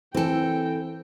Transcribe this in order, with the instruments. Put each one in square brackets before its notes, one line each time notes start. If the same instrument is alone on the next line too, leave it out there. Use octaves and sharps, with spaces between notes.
[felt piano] E3 [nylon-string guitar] C4 A4 [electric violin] G5